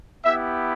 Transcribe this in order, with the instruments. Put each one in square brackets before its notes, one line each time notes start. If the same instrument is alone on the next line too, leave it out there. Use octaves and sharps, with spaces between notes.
[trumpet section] B3 E4 G4 E5